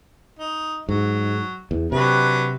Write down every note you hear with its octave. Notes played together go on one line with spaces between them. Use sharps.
D#4
G#2 F#3
E2
C3 F#3 D4 B4